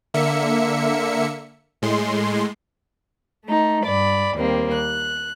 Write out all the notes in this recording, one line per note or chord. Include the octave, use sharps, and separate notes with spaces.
D3 A#3 E5 C#7
A2 G#3 C6
A3 D#4
G2 D5 B5
D#2 G3 A#3 C4
F#6